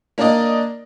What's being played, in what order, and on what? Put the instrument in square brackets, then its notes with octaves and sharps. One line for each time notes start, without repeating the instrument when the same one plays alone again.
[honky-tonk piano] A#3 D4 A#4 D5 D#5